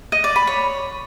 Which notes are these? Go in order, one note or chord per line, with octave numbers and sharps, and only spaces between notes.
D#5
D5
B5
C#5